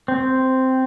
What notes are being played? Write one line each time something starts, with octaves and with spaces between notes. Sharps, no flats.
C4